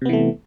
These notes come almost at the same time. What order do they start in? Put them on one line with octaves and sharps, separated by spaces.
C3 B3 E3 A3